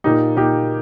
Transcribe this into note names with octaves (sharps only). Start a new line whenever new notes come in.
A#2 A#3 D#4 G4
A#2 A#3 D#4 G4